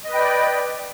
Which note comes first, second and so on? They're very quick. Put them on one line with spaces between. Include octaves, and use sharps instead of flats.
D#5 B4 G5 D5